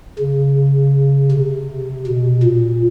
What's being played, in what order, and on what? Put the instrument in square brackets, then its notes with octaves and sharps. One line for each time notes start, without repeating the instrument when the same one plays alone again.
[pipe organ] C#3
C3
B2
A#2